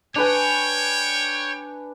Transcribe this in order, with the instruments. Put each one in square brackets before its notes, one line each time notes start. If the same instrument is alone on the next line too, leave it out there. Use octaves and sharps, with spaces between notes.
[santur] D4 B4 G#5 [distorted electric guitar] C#5 [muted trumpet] G5